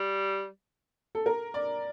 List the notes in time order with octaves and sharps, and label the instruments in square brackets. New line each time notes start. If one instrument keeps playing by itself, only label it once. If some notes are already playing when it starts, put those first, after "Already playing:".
Already playing: [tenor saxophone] G3
[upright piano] A4
A#4
D5